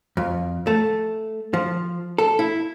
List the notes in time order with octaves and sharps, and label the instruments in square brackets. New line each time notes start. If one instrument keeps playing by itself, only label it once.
[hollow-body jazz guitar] F2
A3
F3
A4
E4